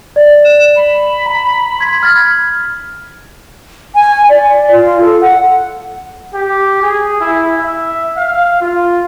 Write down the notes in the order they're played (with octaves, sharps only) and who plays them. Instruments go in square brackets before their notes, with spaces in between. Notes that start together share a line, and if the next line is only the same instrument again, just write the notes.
[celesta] D5
[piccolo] E7
B5
[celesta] A#5
C6 G#6 B6
F6 G#6 A6
[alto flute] G#5
D5
F4
A4
F#5
[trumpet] G4
G#4
E4
E5
F5
F4